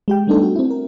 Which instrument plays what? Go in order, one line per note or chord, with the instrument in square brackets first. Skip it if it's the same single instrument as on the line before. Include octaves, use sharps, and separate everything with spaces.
[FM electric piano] G#3 G4 G5
G3 A3 B3 D4 D#4 A4
F#4
C4 E4
A#4